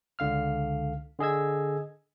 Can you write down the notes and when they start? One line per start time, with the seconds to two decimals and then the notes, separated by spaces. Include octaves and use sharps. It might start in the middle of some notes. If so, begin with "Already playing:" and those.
0.19 C#2 D3 F5 F6
1.19 D3 G#4 D#5 E6 G#6